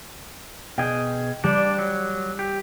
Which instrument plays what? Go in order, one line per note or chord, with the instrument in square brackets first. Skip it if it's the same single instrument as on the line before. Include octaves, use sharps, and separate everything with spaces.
[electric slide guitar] B2 G#4 [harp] G5
[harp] G3 [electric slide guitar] D4
[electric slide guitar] F#3
G4